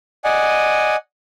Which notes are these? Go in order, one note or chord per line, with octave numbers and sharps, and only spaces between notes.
D5 D#5 F#5 G#5